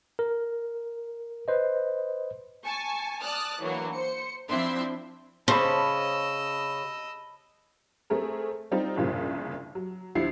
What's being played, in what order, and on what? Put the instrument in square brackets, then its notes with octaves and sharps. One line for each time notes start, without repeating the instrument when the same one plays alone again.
[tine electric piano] A#4
B4 C5 D#5
[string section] G#5 A5 C#6
D5 A5 D#6 F6 F#6 A6
E3 F#3 A#3 D4
C5 C#7
F3 C4 D4 E4 E5 C6
[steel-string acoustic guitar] C#3 [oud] C5 [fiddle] D#5 E6 [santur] A5 B5
[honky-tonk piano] A3 C4 G#4 A#4
G3 C4 D#4 F4
G1 C2 A#2 C#3 F3
F#3
D2 F3 E4 C7